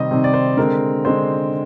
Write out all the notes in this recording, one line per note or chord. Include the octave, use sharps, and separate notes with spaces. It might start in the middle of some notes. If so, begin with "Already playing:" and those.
Already playing: C3 D#3 G3 C4 D#5
C3 D#3 G3 C4
D5
C5
D3 G#3 C4 A#4
D3 G#3 C4 C5